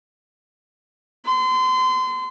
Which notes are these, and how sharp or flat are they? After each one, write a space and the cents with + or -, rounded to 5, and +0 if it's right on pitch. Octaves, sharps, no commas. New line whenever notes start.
C6 -30